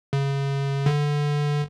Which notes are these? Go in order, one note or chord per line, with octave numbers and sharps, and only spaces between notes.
C#3
D3